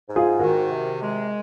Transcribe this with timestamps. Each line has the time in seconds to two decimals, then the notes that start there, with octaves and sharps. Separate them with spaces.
0.08 G#2
0.16 F4 G#4
0.39 D#3 F#4 A#4
0.70 C3
1.01 G#3